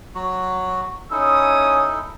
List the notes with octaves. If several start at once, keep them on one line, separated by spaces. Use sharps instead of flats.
F#3 F#4
C#4 D#4 E4 A4 D#6